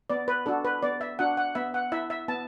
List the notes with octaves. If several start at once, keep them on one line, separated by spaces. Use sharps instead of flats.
B3 D5
B4
D4 F#4 A4
B4
B3 D5
E5
D4 F#4 F#5
F#5
B3 E5
F#5
E4 E5
E5
B3 A5